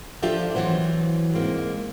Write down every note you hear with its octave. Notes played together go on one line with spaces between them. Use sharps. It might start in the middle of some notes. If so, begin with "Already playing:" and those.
F3 D4 F4 G4 A4 E5
E3 F#3 B3 C5
G#2 A#3 C4